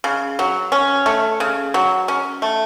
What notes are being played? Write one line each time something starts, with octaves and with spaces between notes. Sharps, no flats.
C#3
F#3
C#4
A3
C#3
F#3
C#4
A3